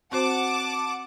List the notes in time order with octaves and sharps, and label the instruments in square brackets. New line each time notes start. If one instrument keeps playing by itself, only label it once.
[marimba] C4 F#4 C5 [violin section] F#5 A5 D6